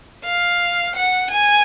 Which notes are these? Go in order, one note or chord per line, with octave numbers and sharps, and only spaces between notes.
F5
F#5
G#5